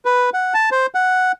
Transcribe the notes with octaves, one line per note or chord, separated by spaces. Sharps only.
B4
F#5
A5
C5
F#5